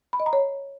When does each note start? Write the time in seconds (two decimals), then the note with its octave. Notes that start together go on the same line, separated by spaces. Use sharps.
0.13 B5
0.20 D#5
0.26 A#5
0.33 C#5